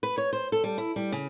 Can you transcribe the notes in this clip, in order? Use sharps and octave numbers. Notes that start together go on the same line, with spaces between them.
B4
C#5
C5
A4
G3
E4
G3
C#3